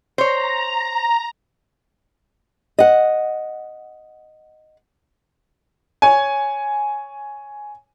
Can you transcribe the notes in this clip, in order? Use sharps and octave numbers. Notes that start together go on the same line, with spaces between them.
C5 C#5 A#5
D#5 F#5
C#5 G#5